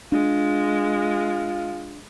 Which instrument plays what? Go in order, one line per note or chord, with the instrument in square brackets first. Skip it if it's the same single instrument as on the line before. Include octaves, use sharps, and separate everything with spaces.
[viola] G#3 [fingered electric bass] D4 [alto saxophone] F4